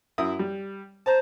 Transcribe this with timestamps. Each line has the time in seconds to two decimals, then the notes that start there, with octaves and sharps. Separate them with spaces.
0.18 F#2 E4 D#6
0.39 G3
1.06 C5 A5 A#5